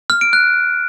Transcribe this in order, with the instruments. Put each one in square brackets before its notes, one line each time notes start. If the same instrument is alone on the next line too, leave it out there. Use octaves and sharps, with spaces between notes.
[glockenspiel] F6
D7
F#6